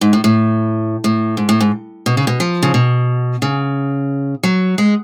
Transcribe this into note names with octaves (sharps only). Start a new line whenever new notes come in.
G#2
A2
A2
A2
G#2
A2
G#2
B2
C#3
B2
F3
C#3
B2
C#3
F#3
G#3